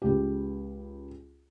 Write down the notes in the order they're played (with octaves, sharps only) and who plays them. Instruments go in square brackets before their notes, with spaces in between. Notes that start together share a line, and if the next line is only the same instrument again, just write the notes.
[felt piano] C#2 G4